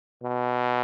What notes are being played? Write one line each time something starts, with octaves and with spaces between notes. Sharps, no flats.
B2